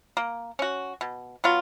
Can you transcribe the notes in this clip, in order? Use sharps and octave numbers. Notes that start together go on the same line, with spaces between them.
A#3
C#4 F#4
B2
F#3 B3 F4